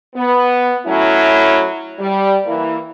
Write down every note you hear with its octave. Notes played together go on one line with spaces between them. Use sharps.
B3
F#3 A3 C#4 E4
G3
E3 A#3